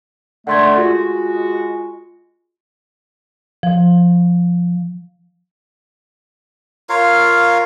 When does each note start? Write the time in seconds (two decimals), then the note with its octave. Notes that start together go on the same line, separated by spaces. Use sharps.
0.47 D3 A3 F#5 C6 G#6
0.76 G#3 F4 F#4
3.63 F3
6.89 F4 A#4 C#5 F5